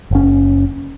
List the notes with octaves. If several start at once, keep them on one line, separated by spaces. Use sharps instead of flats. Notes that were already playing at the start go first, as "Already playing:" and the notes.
F#1 C#4